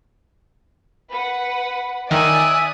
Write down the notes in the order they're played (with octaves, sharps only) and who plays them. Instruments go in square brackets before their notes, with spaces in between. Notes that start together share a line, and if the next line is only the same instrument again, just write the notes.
[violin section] B4 F#5
[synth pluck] D#3 [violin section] D5 G#5 D#6 [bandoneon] E5 F#6